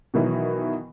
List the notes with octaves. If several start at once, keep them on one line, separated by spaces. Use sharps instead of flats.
B2 D#3 E3 F#3